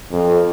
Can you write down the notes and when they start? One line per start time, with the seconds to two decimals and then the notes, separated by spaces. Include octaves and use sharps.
0.11 F2